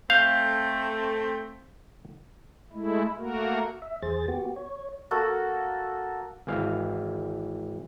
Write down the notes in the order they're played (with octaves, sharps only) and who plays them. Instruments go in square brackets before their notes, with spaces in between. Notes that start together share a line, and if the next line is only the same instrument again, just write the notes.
[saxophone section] A3 C4 [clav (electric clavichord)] F5 [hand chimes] G6
[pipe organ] G#3 A3 E4
A3 A#3 F#4 A#4
[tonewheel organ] E5
E2 G#4 C5 A6
B3 F#4 G4
C#5
[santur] A#3 F#4 A4
[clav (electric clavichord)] G#1 E3 F5